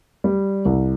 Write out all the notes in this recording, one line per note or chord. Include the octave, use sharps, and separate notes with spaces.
G3
C2